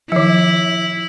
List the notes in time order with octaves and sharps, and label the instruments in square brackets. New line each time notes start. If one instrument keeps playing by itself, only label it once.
[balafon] D#3 F3 [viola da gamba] E4